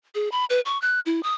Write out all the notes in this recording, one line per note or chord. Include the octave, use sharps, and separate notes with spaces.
G#4
B5
B4
C#6
F#6
E4
D#6